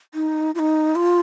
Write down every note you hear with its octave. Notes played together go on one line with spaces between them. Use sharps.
D#4
F4
D#4
F4